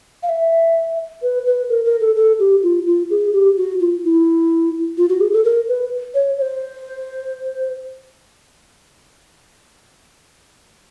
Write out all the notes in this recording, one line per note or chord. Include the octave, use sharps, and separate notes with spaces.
F5
E5
B4
B4
A#4
A#4
A4
A4
G4
F4
F4
G#4
G4
F#4
F4
E4
F4
F#4
G#4
A4
A#4
B4
C#5
C#5
C5